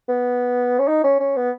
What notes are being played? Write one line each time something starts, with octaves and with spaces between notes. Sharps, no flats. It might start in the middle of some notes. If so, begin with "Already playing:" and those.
B3
C#4
D#4
C#4
C#4
B3